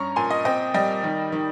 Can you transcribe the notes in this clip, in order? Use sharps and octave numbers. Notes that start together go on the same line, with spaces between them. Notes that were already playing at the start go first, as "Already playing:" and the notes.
Already playing: G2 C#4 A#5 C#6
A#2 G#5 C6
D#5
C4 D#5 G5
G3 D#5 G5
D#3
D#3